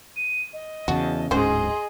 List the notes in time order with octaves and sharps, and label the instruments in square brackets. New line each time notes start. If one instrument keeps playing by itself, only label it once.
[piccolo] D#7
D#5
[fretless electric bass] E2 C#3 [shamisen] F#4 [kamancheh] A5
[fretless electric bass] D1 G#2 [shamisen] C#4 F#4 C5 [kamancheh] G#4 D#5 [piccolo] C6